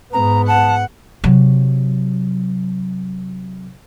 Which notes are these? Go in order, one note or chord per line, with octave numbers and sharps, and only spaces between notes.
G#2 B3 A#5
F#5 A5
C3 F#3